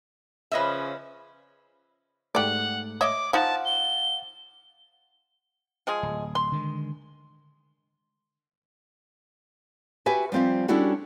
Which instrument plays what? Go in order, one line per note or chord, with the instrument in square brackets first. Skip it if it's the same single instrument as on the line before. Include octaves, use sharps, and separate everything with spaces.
[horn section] C#3 F3 C#4 [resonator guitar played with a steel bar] B4 D#5 E5
[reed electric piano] G#2 A3 [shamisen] G4 D5 [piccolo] F#5
[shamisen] C#5 D#5 E5 [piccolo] D6
[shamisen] F3 D#4 [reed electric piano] F5 F#5 [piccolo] A5
[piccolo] G7
[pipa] F3 G#3 G#4
[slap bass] D1
[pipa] C6
[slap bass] D3 D#3 G#3
[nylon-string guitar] F#4 G4 B4 E5 G#5
F3 G3 C4 F4 E5
G3 C#4 D4 E4 F#4 A4